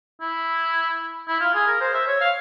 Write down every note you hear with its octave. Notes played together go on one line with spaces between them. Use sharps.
E4
E4
F4
G#4
A#4
C5
E5
C#5
F5